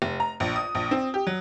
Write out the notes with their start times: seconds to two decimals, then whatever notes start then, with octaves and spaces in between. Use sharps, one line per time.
0.02 F1
0.20 A#5
0.40 A#1
0.56 D#6
0.75 A#1
0.91 C4
1.14 G4
1.27 F#3